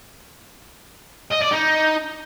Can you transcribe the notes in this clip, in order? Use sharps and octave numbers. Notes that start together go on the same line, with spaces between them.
D#5
D5
D#4